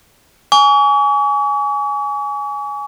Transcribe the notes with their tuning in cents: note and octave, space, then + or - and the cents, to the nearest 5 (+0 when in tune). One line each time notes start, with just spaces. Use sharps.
G#5 +0 C#6 +45